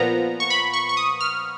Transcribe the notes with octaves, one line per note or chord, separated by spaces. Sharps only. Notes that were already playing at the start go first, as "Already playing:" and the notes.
Already playing: A#2 F3 B3 A#5
C#6
B5
C#6
C#6
D#6
F6